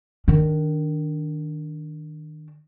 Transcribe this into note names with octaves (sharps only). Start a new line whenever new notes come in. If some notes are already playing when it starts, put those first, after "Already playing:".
D#3 D4